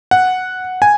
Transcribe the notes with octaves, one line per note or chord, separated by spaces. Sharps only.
F#5
G#5